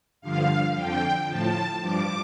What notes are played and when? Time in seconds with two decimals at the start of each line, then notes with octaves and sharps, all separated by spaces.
0.21 G2 D3 F3 F5
0.75 F2 D3 F3 G5
1.28 A2 F3 A5
1.81 G2 F3 D6